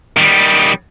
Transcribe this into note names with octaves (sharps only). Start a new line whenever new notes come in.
D#3 G3